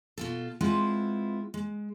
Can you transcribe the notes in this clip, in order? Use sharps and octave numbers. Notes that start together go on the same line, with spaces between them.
B2 F4 A4
G#3 C4 E4 F4 B4 F#5
G#3